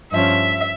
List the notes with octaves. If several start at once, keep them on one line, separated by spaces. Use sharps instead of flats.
G2 F3 C#4 E5